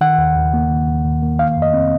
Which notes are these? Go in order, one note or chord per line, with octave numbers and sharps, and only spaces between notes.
D#3 F#5
D#2
D#2
A#3
D#3
D#2
D#2
A#3
D#3 F5
F2
D#5
C4